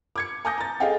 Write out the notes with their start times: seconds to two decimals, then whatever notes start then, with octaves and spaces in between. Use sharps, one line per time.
0.16 D6 G#6 C#7
0.45 G#5 A5 D6 D#6 G6 A#6
0.58 A#5 A6
0.80 G#4 A4 D#5 F5 G5 G#5